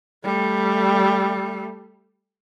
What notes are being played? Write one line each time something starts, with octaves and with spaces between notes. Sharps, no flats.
G3 A3